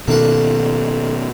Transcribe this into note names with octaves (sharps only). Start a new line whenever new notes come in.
B2 D#3 A3 A#3 F#5